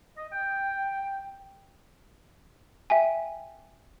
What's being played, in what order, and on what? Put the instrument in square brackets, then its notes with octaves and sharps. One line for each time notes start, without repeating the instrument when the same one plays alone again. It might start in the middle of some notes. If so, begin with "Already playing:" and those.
[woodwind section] D#5
G5
[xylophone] E5 G5 G#5